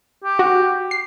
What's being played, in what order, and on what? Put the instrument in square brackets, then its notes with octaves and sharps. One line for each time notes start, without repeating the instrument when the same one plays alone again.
[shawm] G4
[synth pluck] F#4
C7